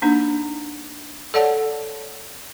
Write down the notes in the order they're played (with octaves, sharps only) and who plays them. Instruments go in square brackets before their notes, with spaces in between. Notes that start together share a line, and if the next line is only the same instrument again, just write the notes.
[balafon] A#3 D4 D#4
A4 C#5 D5 F#5 A5